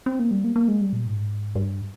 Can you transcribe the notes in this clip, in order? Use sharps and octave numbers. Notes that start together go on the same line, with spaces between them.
C4
A#3
G3
A#3
A#3
G#3
G3
A#2
G#2
G2